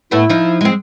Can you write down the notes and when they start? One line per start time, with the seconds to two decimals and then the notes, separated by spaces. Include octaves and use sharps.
0.11 A2 A3 B3 E4
0.30 F3 D#4
0.61 G#3 C4